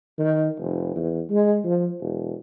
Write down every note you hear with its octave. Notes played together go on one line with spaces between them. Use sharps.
D#3
F1
E2
G#3
F3
E1